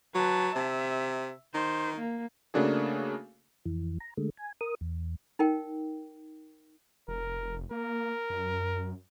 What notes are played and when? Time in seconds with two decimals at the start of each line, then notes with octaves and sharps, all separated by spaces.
0.15 F#3 B4 A5
0.56 C3 E5
1.54 D#3 C5
1.96 A#3
2.54 C#3 A3 A#3 D4 F#4 G#4
3.65 F2 E3
4.00 A#5
4.17 D3 G#3 A3
4.38 G#5
4.61 A#4 D#6
4.81 E2
5.39 D#4 A#4 G5
7.08 F1 A#4
7.71 A#3 A#4
8.30 F#2